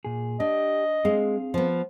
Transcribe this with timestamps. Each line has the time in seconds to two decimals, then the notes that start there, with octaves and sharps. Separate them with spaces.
0.05 A#2 G#4
0.40 D4 G4 D#5
1.05 G#3 C4 G#4 F5
1.54 F3 B3